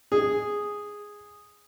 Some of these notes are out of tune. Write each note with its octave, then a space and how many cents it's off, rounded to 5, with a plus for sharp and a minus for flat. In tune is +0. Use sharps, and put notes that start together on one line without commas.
G#4 -5